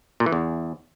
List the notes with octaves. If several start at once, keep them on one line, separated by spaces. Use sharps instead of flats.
A#2
E3
E2